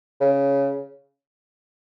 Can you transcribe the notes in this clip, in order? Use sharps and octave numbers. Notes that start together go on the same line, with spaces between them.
C#3